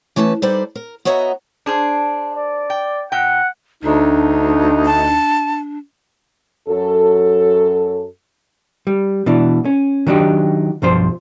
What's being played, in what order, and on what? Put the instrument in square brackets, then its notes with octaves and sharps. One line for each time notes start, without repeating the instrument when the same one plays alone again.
[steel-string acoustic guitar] E3 A3 C#4 B4 A5
G3 D#4 A4 B4 C5 D5
A#4
B3 F#4 C#5 D#5 E5 A#5
[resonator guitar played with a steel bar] D4 G#4 C5
[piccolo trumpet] D5
[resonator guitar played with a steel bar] G5
[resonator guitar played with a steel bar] A#2 G5 [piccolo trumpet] F#5
[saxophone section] D2 D#4 [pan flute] D4
[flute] A5
[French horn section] F#2 F#3 A4
[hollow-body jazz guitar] G3
B2 E3 D4
C#4
D#3 F#3 D4 D#4 G4
B1 G2 F3 C5